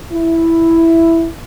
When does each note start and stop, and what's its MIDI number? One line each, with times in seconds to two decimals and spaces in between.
0.12 1.28 64